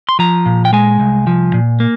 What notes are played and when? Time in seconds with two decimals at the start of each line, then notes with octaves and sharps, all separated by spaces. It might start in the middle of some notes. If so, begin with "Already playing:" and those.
0.09 C6
0.19 F3 A#5
0.46 A#2
0.65 G5
0.73 G#3 G#5
1.00 C2
1.27 F3
1.54 A#2
1.80 A#3